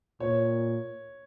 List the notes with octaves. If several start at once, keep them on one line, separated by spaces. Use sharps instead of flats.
A#2 C#5